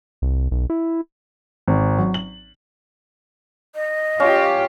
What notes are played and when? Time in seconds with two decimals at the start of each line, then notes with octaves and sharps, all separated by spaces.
0.22 C2
0.51 B1
0.70 E4
1.68 G#1
1.98 F#3
2.14 F#7
3.75 D#5
4.20 C#4 F4 G4